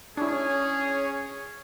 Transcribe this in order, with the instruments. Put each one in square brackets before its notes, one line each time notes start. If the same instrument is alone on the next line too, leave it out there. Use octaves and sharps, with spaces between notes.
[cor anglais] C#4 [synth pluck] D4 E4 [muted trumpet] G#4 [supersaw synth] C#5